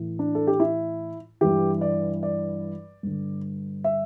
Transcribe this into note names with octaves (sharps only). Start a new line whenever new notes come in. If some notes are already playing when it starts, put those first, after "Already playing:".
Already playing: A2 E3
D4
A4
G4
E4
G2 E3 G4
D5
D5
G2 D3
E5